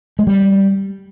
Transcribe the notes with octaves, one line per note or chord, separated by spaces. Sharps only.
G#3
G3